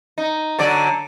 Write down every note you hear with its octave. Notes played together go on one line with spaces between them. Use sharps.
D#4
D3 F#3 D5